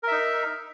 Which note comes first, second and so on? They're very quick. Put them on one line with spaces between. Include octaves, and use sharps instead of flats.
A#4 E5 D#4